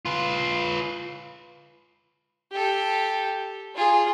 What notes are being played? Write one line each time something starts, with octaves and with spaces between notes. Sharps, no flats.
F4 B4
G4 A4
F4 G#4